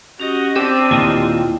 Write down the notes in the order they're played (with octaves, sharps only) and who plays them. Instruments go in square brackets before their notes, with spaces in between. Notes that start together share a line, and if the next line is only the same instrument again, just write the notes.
[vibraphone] C#4 G4 [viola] F#4 D#5
[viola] C4 D4 [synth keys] G4 E6 D#7 [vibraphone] C5
[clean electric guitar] D#2 A#2 D#5 [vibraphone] E4 F4 G5